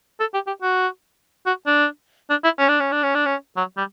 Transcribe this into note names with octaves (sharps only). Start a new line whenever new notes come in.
A4
G4
G4
F#4
F#4
D4
D4
E4
C#4
D4
C#4
D4
C#4
D4
C#4
F#3
G3